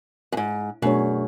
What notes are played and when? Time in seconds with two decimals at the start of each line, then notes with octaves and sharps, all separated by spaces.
0.32 F#2
0.37 G#2
0.82 F#2 B2 A3 D4 G#4 C#5